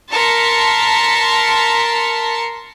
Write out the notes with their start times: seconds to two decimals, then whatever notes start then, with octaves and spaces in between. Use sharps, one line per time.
0.12 A#4 A5 C6 B6 C#7